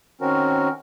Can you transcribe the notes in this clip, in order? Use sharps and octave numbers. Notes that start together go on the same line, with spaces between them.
D#3 C4 C#4 F#4 A#4